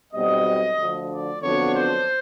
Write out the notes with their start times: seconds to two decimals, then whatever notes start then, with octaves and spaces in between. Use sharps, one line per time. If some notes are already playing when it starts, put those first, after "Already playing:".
0.13 B1 B2 G3 C4 D#5
0.78 D2 D3 F3
1.11 D5
1.43 F2 D3 F#3 B3 D4 C#5
1.75 C5